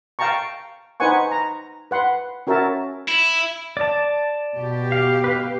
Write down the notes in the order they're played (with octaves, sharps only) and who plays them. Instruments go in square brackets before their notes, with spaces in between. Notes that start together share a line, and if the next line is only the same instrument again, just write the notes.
[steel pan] F5 G5 A5 A#5 C#6
D#4 B4 C5 F#5 G#5 C#6
A#5
B4 F#5 C6
C#4 F#4 A#4 C#5 E5 A5
[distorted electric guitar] E4
[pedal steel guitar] D5 A5
[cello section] B2 G4
[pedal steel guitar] F5
B4 F5